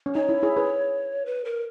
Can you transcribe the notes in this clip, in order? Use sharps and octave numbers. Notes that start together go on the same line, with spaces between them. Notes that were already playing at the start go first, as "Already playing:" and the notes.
C#4
D#4 C#5
E4
E4 G#4
G#4 B4
B4
A#4